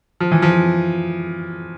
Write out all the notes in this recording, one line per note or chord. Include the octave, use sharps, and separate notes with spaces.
F3
E3
F3